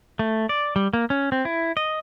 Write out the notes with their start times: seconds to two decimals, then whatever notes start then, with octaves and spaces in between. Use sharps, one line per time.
0.19 A3
0.49 D5
0.76 G3
0.93 A#3
1.10 C#4
1.32 C4
1.45 E4
1.77 D#5